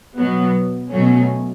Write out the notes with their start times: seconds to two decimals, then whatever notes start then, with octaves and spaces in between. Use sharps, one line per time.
0.18 B2 F#3 B3
0.92 B2 F#3 A3 C#4